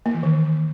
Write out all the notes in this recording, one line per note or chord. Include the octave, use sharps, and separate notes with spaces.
A#3
E3
D#3